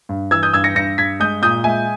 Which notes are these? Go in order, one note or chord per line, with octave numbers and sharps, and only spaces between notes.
G2
E3 E6 G#6
D#6 G6
G2 E6 G#6
A#6 C#7
G2 A#6 C#7
G2 G#6 B6
G#3 D#6 G6
A#2 D#6 G6
G#3 E5 G#5